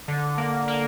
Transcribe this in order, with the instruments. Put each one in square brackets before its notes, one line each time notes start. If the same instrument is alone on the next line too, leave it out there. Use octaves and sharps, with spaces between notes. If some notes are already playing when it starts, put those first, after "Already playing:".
[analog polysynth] D3
A#3
A#3